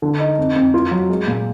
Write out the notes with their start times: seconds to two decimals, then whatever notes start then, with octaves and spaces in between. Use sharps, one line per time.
0.02 D3
0.20 D#4
0.38 F2
0.56 F2
0.74 F4
0.91 F#3
1.10 G#3
1.27 A#2